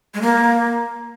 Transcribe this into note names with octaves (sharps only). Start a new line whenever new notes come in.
G#3
A#3